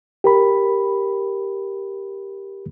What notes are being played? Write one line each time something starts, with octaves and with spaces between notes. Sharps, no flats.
G4 A#4 B5